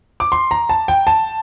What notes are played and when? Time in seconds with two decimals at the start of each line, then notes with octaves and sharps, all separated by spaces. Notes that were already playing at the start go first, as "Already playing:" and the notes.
0.20 D6
0.32 C6
0.51 A#5
0.69 A5
0.88 G5
1.07 A5